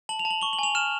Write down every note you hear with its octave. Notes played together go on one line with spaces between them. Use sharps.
A5 F#7
F7
A5
F#7
C#6 G7
F#7
G#5 F7
F6 E7